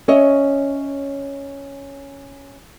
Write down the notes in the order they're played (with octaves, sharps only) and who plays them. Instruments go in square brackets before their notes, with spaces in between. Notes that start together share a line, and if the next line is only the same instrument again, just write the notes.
[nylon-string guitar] C#4 C#5 D#5 E5